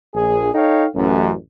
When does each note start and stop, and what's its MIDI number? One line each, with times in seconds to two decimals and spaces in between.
0.15 0.50 34
0.15 0.50 68
0.54 0.86 63
0.54 0.86 69
0.54 0.86 73
0.54 0.86 77
0.54 0.86 79
0.95 1.33 33
0.95 1.33 42